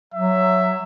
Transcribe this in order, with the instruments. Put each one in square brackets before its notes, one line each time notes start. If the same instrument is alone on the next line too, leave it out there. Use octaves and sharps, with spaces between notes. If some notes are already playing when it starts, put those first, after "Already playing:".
[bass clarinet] F#3 [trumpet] E5